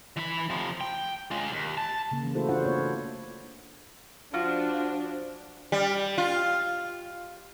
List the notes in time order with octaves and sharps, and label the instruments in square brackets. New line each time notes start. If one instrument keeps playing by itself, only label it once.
[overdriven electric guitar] E3 B5
C3 F3
G5
G#3 F4
D#2
A5
[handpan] C#3 A#3
E3 A#3
A3 E4 F#4 A4 C5
D4 F4 C5 F#5
A#3 B3 F4 C#5
F4
[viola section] F3 D4 [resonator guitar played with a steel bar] F4 F#4
[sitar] G3
F4